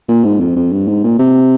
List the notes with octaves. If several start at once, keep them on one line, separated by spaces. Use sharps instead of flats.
A#2
G#2
F2
F2
G2
G#2
A#2
C3